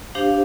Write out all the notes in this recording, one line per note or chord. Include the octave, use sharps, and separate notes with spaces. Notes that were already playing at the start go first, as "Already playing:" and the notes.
D4 G4 C5 F5